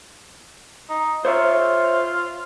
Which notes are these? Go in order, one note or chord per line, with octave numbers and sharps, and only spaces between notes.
D#4
F4 C5 C#5 E5